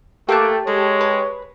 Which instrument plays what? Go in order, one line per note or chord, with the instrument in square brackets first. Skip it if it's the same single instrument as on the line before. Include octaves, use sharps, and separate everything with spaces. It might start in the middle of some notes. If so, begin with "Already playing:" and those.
[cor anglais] A3 [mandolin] A#3 D6 F#6 [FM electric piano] G4 G5 A5 [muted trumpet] A4
[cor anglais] G#3 [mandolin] A4 [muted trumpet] C#5
[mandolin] B4